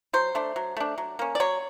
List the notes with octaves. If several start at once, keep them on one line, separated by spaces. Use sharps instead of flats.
F#3 C5
A3 D4
F#3
A3 D4
F#3
A#3 C#4
D5
F#3 C#5